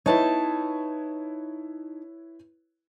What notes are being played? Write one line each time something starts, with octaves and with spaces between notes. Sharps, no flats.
D#4 E4 B4 C#5 A5